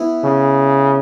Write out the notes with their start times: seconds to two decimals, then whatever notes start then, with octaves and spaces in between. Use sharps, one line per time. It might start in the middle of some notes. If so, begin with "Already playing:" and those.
Already playing: E3 B3 E4
0.24 C#3